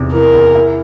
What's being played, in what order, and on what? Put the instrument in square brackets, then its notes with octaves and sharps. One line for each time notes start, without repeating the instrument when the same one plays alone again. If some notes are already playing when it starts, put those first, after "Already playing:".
Already playing: [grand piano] E2 C3 D#3
[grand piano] E3 [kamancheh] A#4
[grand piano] E2
E4